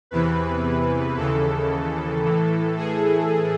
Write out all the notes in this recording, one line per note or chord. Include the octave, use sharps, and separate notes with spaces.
E2 C3 E3 B4
D#2 C#3 E3 A4
A2 E3
G#4